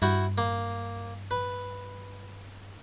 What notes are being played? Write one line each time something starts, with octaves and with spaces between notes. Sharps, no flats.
G2 E4 F#4 G5
A#3
B4